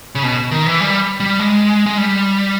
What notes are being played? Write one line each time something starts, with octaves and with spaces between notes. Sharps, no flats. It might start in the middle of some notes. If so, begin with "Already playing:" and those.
C#3
B2
D#3
E3
G3
G3
G#3
G#3
G3